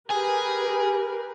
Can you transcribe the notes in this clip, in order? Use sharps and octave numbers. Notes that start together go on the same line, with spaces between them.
G4 G#4 A#4 B4 G#5